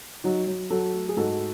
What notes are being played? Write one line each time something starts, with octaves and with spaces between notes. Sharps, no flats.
F#3 D#4 F#4
F#3
F#3 F#4 A4
A3
G#4
G#2 F#4 A4